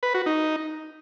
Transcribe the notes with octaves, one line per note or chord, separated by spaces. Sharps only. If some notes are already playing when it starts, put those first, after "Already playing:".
B4
F#4
D#4